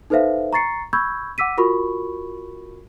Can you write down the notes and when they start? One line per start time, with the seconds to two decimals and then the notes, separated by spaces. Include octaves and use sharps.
0.10 D#4 A4 B4 C5 E5 F5
0.53 A#5 C#6 A6 C7 C#7
0.93 B5 C#6 E6 G6 G#6
1.38 F#5 D6 E6 B6 D#7
1.58 F4 F#4 A#4 B5 C#6